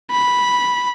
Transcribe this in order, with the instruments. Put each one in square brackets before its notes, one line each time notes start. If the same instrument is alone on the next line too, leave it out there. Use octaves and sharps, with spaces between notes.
[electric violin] B5